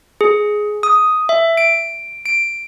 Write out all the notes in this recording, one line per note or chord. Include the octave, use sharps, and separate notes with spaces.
G#4
D#6
E5
D7
D7